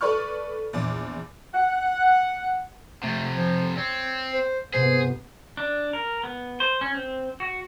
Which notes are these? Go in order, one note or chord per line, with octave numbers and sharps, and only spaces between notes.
A4 B4 D5 B5 C#6 F6
A#1 E2 D6
F#5
F2 C3 A3
F3
C4 C#5
C5
G1 C3 B3 G#4 C5
D4
A#4
B3
C5
C#4
C4
F#4